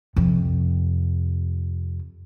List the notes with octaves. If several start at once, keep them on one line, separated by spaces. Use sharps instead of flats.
F2 C3